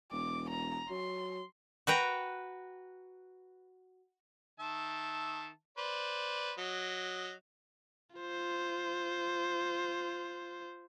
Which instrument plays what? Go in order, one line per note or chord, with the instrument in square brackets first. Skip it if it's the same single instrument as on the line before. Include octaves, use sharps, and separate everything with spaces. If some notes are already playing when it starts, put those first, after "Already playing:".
[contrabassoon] E1 [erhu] D6
[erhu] A#5
[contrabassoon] F#3 [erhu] C6
[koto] F#4 B4 G5 A#5
[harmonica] D#3 E5 A5
B4 C5 D5
F#3 D#5
[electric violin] F4 C5